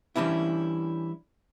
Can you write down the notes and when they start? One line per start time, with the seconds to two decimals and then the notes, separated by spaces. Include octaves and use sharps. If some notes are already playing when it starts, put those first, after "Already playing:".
0.16 E3 G3 C#4 D4 E4